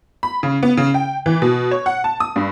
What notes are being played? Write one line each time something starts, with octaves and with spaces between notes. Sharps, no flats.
B5
C#3
B3
C#3
G5
E3
B2
C#5
F#5
A5
D#6
G2